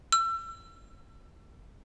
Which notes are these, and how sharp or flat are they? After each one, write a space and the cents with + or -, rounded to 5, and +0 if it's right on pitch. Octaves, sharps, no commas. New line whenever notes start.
E6 +35